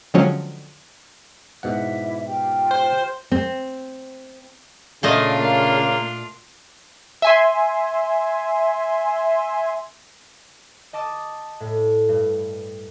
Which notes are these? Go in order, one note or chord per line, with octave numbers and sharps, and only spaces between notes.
D3 F3 F#3 G#3 C4 C#4
G#2 B2 E4 E5 F#5 D6
F4 G4 G5
C5
C4
A#2 C#3 A3 D4 F4 D#5
A#3
E5 G#5 C6
D#5 A5 D6 E6
A2
G2